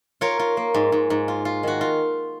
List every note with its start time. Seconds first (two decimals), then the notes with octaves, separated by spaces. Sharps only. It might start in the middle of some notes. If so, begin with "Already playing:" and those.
0.21 F4 A#4 C#5
0.39 F4
0.57 A#3
0.74 G#2
0.92 G#2
1.10 G#2
1.28 F4
1.45 F4
1.63 D#3 F#4
1.81 F4